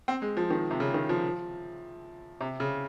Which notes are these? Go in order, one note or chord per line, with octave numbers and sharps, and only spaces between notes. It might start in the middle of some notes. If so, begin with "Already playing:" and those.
C4
G#3
F3
D#3
C3
C#3
D#3
F3
C3
C#3